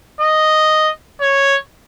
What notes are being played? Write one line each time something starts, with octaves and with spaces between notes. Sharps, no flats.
D#5
C#5